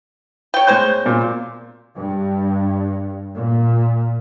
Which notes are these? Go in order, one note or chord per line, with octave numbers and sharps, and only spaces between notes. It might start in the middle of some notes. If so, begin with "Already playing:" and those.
C#5 G5
A2 G#3 C5 C#5 G6
A#2 F4
G2
A#2